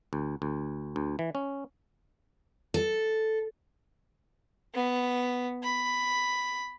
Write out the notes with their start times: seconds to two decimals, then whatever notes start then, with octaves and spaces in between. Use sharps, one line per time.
0.13 D2
0.42 D2
0.96 D2
1.19 E3
1.35 C#4
2.74 A4
4.74 B3
5.63 B5